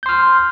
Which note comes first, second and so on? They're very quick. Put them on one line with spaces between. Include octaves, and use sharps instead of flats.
G6 C6 F6